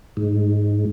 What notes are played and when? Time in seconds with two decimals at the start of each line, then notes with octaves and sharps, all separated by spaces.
0.17 G#2